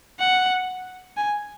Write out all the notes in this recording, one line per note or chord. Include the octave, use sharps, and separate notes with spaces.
F#5
G#5